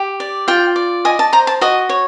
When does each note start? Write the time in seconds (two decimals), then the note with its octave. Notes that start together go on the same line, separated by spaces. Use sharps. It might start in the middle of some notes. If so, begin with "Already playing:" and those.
Already playing: G4
0.20 D5
0.48 F4 G5
0.76 D5
1.05 D#5 G#5
1.19 A5
1.33 C5 A#5
1.47 A5
1.61 F#4 D#5
1.89 C#5